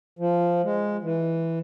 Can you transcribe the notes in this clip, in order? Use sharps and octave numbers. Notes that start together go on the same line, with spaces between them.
F3
G#3
E3